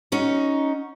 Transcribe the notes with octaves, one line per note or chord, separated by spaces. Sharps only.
C#4 D#4 F#4